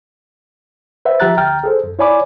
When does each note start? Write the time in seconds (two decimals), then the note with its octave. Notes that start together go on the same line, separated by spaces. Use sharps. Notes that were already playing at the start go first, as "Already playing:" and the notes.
1.05 B4 C5 E5 F#5
1.20 F3 G4 E5 A#5 F#6 A6
1.37 D2 G5 A#5 F6 A6
1.64 G#4 A4 C5
1.84 F#2
1.99 E4 C#5 D5 G#5 B5 D6